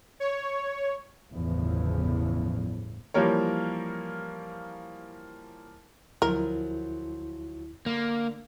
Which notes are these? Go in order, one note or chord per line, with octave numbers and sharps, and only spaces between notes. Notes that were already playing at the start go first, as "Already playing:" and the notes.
C#5
G1 E2 A2 C#3 E3 F3
E3 F3 G3 A#3 A#4 C#5
D2 F3 F#3 E4 G#4 A#4
D3 A#3